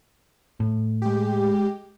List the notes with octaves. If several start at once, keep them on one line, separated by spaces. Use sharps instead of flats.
A2
G#3 G4